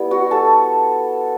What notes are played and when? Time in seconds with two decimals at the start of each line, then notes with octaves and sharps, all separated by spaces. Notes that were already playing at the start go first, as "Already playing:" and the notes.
Already playing: G3 B3 E4
0.11 F#4 F#5
0.31 A4 A5